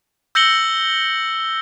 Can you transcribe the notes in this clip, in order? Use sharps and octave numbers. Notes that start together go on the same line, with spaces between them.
E6 G6 A#6 C#7 F#7 G7